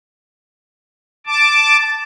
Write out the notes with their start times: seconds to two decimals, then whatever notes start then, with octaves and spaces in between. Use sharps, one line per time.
1.26 A5 D6